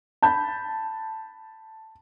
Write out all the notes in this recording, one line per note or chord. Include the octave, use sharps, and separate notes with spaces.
A5 B5 G6